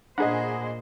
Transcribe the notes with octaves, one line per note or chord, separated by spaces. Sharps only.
A#2 D4 G#4 C5 D#5 F#5 A#5 B5